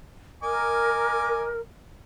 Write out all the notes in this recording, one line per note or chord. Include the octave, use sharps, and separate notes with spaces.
A#4 D#5 G#5 D6